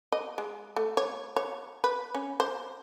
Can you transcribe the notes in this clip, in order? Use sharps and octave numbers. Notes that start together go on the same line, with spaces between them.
D#5
G#3
A3
C#5
C#5
B4
C#4
C5